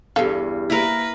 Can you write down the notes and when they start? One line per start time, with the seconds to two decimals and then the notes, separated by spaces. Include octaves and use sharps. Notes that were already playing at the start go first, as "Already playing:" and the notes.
0.16 E2 G2 A4 F5
0.70 A#3 E4 A#4 B4